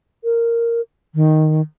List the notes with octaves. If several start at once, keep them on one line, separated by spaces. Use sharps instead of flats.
A#4
D#3